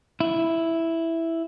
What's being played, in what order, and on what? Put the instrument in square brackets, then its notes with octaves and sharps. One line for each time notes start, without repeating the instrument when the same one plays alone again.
[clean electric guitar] E4